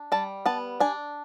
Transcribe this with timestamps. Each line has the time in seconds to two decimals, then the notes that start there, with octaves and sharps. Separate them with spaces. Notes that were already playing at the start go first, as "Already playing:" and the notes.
Already playing: D4
0.12 G3 A5
0.46 B3 A5
0.80 D4 G#5